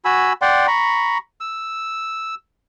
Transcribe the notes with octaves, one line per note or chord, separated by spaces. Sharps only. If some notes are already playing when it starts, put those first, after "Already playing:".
F#4 G#5 B5 E6
D5 F#5 G5 C6
A#5 B5 C#6
E6